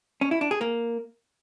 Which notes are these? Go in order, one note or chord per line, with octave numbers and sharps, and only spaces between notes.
C#4
E4
D4
G#4
A#3